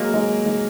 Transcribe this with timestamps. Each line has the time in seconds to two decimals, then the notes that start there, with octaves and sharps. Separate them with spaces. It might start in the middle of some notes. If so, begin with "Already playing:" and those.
Already playing: F#3 G#3 A#3
0.14 G#3
0.46 G#3